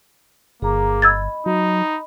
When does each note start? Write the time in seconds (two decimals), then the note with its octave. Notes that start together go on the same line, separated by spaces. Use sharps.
0.62 G1 A#3 G#4 A#5 D6
1.02 D#5 B5 E6 G#6 A6
1.46 F#3 D#4